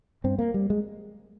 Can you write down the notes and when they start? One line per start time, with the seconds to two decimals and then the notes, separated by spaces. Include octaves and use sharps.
0.24 G2 C4
0.39 A#3
0.54 G3
0.70 G#3